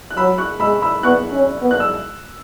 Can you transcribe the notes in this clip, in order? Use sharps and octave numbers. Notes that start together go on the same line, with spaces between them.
F#6
F#3 B5 E6
C#6 F#6
G#3 B5 E6
B5 E6
B3 C#6 F#6
C#4
B3
F#6
E6